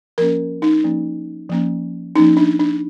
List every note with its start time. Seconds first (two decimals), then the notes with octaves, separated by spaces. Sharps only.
0.18 F3 A#3 C#4 A#4
0.62 D#4
0.84 F3 A#3 C#4
1.50 F3 A#3 C#4
2.16 F3 A#3 C#4 D#4
2.37 D4
2.59 D4